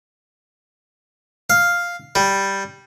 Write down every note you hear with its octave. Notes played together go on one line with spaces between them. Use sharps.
F5
G3